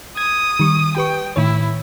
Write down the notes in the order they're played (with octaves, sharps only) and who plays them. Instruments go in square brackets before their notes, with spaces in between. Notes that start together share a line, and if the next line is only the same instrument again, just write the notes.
[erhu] D#6 [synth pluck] G#6
[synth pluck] D#3 G3 C#6
[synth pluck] G4 B4 C#6 [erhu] G5
[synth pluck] A2 D#3 C#5 [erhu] E4